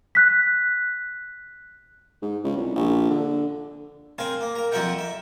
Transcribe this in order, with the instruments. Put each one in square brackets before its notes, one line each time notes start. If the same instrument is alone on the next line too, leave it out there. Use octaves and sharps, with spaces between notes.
[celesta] F#6 B6
[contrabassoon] G#2
C#2
C2
A#1
D3
[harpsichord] C4 A#4 F5 G#5
A#3
A#4 A#5
F2 F4 A#4 E5 F#5 G5
E5